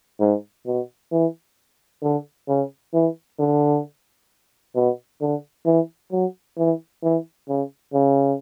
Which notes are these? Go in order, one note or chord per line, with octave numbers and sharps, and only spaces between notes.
G#2
B2
E3
D3
C#3
E3
D3
B2
D3
E3
F#3
E3
E3
C#3
C#3